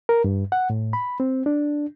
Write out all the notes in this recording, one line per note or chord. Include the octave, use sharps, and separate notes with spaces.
A#4
G2
F#5
A2
B5
C4
D4